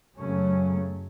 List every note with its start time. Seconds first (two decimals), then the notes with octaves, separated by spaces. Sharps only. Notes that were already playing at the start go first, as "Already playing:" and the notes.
0.17 F#2 C#3 F#3 A3 C#4